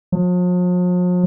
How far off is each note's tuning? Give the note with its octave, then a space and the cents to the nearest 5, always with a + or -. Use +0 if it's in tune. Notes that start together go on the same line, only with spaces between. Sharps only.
F3 +45